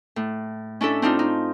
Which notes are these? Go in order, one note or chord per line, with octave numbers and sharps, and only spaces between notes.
A2
C#4 D4 E4 A4
C4 D4 D#4 F4
D#4